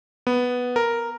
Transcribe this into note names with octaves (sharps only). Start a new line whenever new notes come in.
B3
A#4